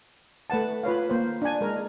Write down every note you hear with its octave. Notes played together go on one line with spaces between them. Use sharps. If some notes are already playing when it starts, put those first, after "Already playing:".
A3 B4 F#5 A5
F4 B4 C#5 F5
A#3 C5
D4 G#5
G#3 A#4